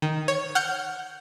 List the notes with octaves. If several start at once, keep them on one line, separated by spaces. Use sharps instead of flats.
D#3
C#5
F#5 F6 G6 C#7